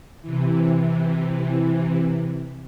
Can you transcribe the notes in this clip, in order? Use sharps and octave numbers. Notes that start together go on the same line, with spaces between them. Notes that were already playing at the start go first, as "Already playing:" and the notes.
C3 E3